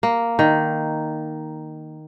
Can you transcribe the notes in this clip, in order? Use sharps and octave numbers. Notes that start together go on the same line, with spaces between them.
A#3
D#3